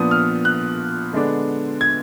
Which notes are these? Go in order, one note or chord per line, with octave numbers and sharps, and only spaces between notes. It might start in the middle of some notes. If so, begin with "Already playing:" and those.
Already playing: A#2 F3 B3 D4 D#6
F6
F#6
D3 G#3 B3 D4
G#6